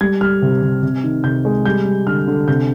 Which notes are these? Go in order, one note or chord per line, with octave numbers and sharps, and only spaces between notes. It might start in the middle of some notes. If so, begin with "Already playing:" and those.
G3 G#6
G3 F6
C3
C3
C3
D#3
C3 G6
G#3
G3 G6
G3
D3 F6
D3
C3 G6